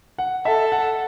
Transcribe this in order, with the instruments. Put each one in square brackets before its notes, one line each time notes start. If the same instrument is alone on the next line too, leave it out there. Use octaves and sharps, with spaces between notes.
[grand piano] F#5
[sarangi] A4 [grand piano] E5
[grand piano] F#5